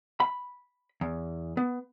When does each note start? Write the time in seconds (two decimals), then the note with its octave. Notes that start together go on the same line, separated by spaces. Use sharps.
0.20 B5
1.01 E2
1.57 B3